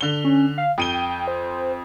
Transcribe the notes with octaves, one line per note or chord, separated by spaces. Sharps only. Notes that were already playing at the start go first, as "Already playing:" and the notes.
D3 G7
C#4
F5
F2 G5 D#7 G7
C5